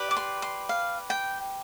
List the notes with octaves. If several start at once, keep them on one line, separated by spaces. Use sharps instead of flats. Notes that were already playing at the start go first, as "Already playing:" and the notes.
Already playing: G4 B4 D5
D6
C6
C6
F5
G5